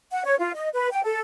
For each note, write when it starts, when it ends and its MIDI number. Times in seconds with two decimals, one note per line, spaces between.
0.11 0.24 78
0.25 0.35 73
0.39 0.51 65
0.55 0.68 75
0.74 0.88 71
0.92 1.02 79
1.04 1.21 69